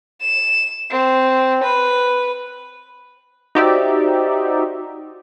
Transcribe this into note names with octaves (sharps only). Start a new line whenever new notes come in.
E7
C4
B4
D#4 F#4 G4 C5 D5 E5